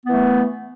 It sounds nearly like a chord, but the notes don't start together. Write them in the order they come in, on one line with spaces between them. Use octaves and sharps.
B3 E3 A3